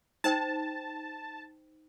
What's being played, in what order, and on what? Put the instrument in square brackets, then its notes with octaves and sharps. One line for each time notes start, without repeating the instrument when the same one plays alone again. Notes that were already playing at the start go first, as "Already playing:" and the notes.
[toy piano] D#4 C5 G5 [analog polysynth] A5